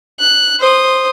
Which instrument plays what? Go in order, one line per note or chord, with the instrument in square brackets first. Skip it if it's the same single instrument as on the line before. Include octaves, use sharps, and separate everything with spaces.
[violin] F#6
C5 D#6